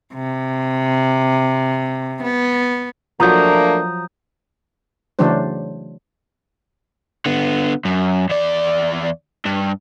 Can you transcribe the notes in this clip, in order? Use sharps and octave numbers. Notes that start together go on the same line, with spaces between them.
C3
B3
F3 F#3 A3 A#3 D4 A#5 D#6 G6
C#3 E3 F#3 A3 D4 C5
D3 B3
F#2
E2 D5
G2